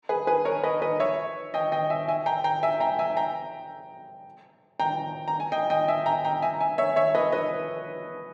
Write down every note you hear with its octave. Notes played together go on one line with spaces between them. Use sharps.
G#4 B4
G#4 B4
A#4 C#5
B4 D#5
B4 D#5
C#5 E5
D#5 G5
D#5 G5
E5 G#5
E5 G#5
G5 A#5
G5 A#5
E5 G#5
G5 A#5
E5 G#5
G5 A#5
G5 A#5
A#5
G#5
D#5 G5
D#5 G5
E5 G#5
G5 A#5
G5 A#5
E5 G#5
A#5
E5 G#5
C#5 E5
C#5 E5
B4 D#5
B4 D#5